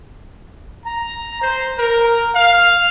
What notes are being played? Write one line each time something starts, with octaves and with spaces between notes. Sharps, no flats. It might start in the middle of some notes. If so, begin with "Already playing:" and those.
A#5
C5
A#4
F5